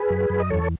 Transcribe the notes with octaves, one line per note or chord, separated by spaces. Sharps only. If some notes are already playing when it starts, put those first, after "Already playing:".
Already playing: G#4 B4
F#2
F#2
D#5
E2 A4 C#5